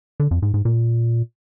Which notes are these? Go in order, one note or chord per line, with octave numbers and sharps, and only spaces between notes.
D3
F2
G#2
G#2
A#2